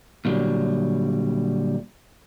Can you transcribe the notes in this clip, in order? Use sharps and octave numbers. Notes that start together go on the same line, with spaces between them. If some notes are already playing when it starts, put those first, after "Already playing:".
A#2 D3 F#3 G3